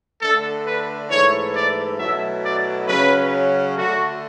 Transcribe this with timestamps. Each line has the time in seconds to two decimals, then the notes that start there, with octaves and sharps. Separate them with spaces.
0.21 D3 A3 D4 A4
0.65 B4
1.10 G#2 E3 A3 C#5
1.54 D5
1.99 B2 F#3 A3 E4 E5
2.43 D5
2.87 C#3 F#3 C#4 B4
3.76 D3 A3 D4 F#4